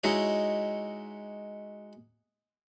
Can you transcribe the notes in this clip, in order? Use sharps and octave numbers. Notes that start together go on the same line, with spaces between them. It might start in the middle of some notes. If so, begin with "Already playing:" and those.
G#3 D#4 E4 F#4 C#5